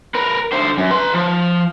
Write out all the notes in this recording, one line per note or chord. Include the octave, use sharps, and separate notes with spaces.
A#4 B4
D3 C5
F#2
B4 C6
F3